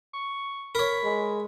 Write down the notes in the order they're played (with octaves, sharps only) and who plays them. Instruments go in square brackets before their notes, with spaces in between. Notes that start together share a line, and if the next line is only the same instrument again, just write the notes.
[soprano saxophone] C#6
[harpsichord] A#4 C#5 [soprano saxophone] B5
[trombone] G#3